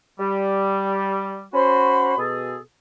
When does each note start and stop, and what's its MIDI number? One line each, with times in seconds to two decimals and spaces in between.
0.20 1.42 55
1.54 2.14 61
1.54 2.14 66
1.54 2.16 72
1.54 2.16 83
1.54 2.16 84
2.17 2.57 47
2.17 2.57 68
2.17 2.63 69